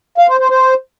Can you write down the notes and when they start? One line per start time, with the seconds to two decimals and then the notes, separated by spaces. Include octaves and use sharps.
0.18 F5
0.29 C5
0.39 C5
0.50 C5